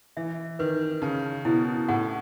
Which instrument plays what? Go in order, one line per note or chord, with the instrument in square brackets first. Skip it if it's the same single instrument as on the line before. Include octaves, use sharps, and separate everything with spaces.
[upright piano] E3 [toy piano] E5
[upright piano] D#3 [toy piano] B4
[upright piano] C#3 [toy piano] A5
[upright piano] B2 [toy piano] E4
[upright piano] A2 [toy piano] F#5